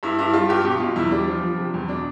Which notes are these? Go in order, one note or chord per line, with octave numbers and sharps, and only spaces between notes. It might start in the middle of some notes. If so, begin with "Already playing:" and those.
G2 E4
G2 E4
G3 F4
G2 G4
B2 G4
B2 F4
E2 E4
G3 D4
F3
F3
C3
E2
B2 D4